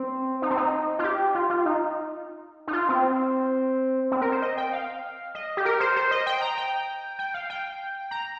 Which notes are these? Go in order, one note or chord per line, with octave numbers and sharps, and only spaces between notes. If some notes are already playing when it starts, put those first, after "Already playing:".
Already playing: C4
D#4
C4
D#4
F4
G4
F4
F4
D#4
D#4
F4
C4
C4
A#4
C5
D#5
G5
F5
D#5
G4
A#4
C5
C5
D#5
G5
A#5
G5
G5
F5
G5
A#5